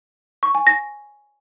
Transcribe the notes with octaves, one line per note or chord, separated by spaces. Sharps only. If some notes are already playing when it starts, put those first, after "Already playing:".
C#6
G#5
A#6